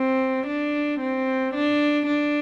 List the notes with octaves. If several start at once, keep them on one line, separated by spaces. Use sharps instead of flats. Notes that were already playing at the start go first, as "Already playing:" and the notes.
Already playing: C4
D4
C4
D4
D4